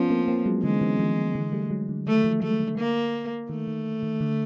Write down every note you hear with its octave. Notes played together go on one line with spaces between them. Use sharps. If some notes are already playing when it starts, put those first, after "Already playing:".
Already playing: F3 B3 C#4
A#3 C4
A#3 C4
F#3 G#3
D3 E3 G#3
E3 F#3
D#3 F3
D3 E3
G3 A3
F#3 G#3
D3
D#3 A3
D#3 F3
F#3 G#3 A3
D3
A#3
D#3 A3
D#3
D#3
D3